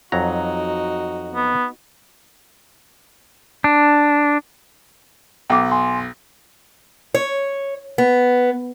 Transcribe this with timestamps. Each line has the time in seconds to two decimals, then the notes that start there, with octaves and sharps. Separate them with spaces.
0.12 F2 F#3 D#4 F#4 A#5
1.35 B3
3.64 D4
5.50 B1 G5 D6
5.72 G#5 C6
7.14 C#5
7.98 B3